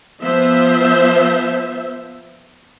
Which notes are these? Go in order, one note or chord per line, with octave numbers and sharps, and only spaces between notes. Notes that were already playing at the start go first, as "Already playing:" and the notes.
F3 B3 C5 E5